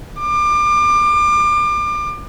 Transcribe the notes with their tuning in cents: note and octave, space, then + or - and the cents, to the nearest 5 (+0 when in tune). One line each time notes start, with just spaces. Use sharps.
D6 +30